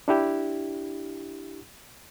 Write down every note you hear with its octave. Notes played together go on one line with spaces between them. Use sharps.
D4 E4 G4